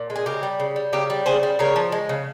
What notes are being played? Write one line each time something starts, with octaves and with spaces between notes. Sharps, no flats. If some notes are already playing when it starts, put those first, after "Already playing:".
Already playing: A#2
G#3
G#4
C#3 G4 A#4
G3
C#3
G3
C#3 G4 A#4
G3
C#3 G#4 C5
G3
C#3 A#4 C#5
F3
G#3
C#3